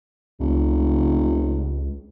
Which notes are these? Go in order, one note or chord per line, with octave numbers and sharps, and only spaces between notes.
F1 C#2